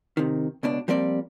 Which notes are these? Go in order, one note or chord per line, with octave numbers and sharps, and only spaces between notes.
C3 D#3
C#2 B2 D4
F3 G3 A#3 C4 D5